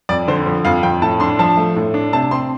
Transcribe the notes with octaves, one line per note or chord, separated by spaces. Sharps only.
F2 D5
D3 C5
F3
F2 F5
F2 G5
A2 A5
D4 C6
F3 A5
A3
A2
D4
C3 A5
C4 C6